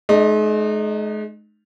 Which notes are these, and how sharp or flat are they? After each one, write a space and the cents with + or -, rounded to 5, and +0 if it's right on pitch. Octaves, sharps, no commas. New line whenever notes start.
G#3 +40 D#4 -25 D#5 -30